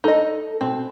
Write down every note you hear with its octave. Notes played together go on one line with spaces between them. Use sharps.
D#4 A4 D#5
B2 C4